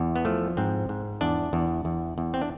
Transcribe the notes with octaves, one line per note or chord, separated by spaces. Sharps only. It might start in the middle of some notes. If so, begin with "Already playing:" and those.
Already playing: E2
B3
F3 A3
G#2 C4
G#2
E2 D4
E2
E2
E2
C4
D4